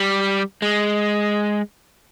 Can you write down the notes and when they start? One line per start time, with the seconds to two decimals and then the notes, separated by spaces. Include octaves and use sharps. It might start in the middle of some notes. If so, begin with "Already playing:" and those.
Already playing: G3
0.62 G#3